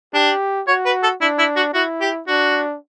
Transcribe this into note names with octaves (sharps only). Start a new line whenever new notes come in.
D4 G4
F#4 C#5
B4
A4
D4 E4
E4
F#4
E4 F#4
G4
D4 F#4